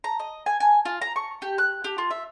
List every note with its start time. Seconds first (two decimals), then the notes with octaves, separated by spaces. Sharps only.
0.04 A#5
0.19 D#5
0.46 G#5
0.60 G#5
0.85 F4
1.02 A#5
1.16 C#6
1.42 G4
1.58 F#6
1.84 G4
1.98 F4
2.11 E5